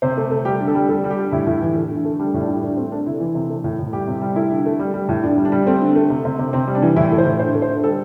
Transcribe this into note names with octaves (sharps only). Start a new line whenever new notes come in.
C3 C5
A3
A3
G3 G4
D3
A4
G3
G3 A4
G3
G4
D3
A2 E4
A2
E3
A3
D3
A3
G3 D4
A2
D4
G3
A3 D4
A3 C4
A3 D4
C3 E4
E3
C3
A3
A2
A2
G3 G4
C3
G3
A3 E4
D3
A3
G3
G3
A2
D3 D4
G3
D4
G3
A3 C4
D3
A3
C3
C3
C3
C3 C4
G3
D4
E3
A2 E4
A3
C5
A2
D3 C5
A3
C5
D3
G3 A4